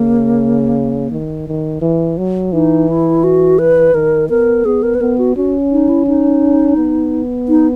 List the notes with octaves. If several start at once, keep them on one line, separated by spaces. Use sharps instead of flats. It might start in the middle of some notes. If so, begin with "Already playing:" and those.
Already playing: C#3 A#3
D#3
D#3
E3
F#3
E3 D#4
E4
F#4
B4
D#3 A#4
B3 A#4
B3 G#4
A#4
B4
B3 A#4
F#4
C#4 F#4
D#4
E4
D#4
B3
D#4